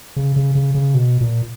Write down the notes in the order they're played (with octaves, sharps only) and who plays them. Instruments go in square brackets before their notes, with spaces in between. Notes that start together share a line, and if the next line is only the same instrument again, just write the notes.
[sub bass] C#3
C#3
C#3
C#3
B2
A#2